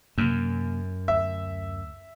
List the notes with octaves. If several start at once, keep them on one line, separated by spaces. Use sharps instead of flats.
F#2 C3 A#3
D2 E5